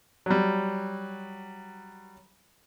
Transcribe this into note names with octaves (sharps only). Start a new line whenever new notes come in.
F#3 G3